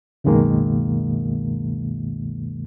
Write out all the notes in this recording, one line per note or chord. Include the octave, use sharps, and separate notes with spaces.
C#2 F#2 B2 D#3 G#3 A#3